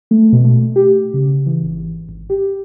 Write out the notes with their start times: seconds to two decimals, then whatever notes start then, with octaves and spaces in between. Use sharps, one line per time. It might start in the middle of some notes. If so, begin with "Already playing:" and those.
0.11 A3
0.33 B2
0.44 A3
0.76 G4
1.14 C#3
1.46 E3
1.62 G#1
2.09 G#1
2.30 G4